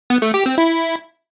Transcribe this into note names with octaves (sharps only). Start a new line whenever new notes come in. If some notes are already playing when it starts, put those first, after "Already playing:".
B3
A3
G4
C4
E4